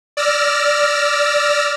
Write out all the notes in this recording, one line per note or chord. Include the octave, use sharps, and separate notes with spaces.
D5 E6 F6 A#6